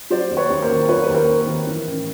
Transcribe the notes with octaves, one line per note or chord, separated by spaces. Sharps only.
F#3 C5 D5
D#2
B4 C#5
D#2
A#4 C5
D#3
F#3 B4 C#5
D#2 B4
A#4 C5
D#2
A#4
D#3
E3
A1